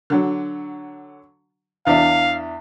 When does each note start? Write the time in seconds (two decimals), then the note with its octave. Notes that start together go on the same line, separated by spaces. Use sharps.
0.10 D3 F#3
1.87 E2 D4 E5 F5